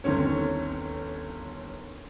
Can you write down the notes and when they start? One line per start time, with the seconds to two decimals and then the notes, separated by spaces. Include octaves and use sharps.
0.04 G1 D#2 C4 C#4 C#5